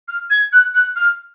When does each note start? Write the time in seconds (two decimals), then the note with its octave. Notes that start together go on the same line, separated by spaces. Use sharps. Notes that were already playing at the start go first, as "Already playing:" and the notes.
0.08 F6
0.30 G#6
0.53 F#6
0.75 F#6
0.96 F6